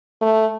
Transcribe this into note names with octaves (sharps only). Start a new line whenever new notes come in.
A3